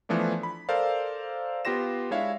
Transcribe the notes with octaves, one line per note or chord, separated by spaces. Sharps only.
E3 F3 A3 B3 D4
B5
A4 A#4 C5 D5 F5
B3 F4 G4 C6 A#6 E7
G#3 D4 E4 C#5 E5 F5